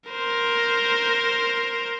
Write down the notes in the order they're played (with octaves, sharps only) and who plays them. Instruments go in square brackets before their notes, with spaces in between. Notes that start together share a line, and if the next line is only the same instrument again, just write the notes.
[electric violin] A#4 C5